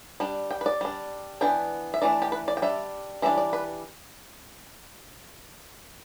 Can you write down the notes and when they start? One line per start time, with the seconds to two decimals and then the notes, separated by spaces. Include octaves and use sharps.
0.20 G3 D4
0.51 G5
0.61 B4
0.66 D5
0.81 G3 D4
1.41 E3 B3 D4 G5
1.94 E5
2.02 E3 A3 D4 D5
2.22 G4
2.32 B4
2.48 D5
2.57 G5
2.62 G3 D4 E5
3.22 E3 G3 D4 E5
3.38 D5
3.53 B4